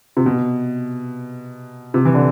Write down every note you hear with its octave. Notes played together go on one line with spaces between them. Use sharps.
C3
B2
C3
E3
D3